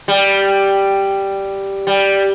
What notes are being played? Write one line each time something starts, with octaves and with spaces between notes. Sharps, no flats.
G3
G3